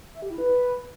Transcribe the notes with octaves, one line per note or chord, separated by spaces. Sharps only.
E5
G4
E4
B4